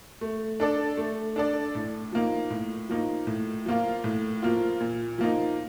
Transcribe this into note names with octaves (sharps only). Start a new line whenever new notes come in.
A3
D4 A4 D5
A3
D4 A4 D5
A2
F3 A#3 D#4
A2
F3 A#3 D#4
A2
F3 A#3 F4
A2
F3 A#3 F4
A#2
F3 A#3 D#4